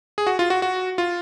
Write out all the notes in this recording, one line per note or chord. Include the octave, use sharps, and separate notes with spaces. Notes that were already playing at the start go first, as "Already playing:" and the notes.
G#4
F#4
F4
F#4
F#4
F4